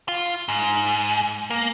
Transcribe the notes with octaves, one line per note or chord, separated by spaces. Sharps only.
F4
G#2
A#3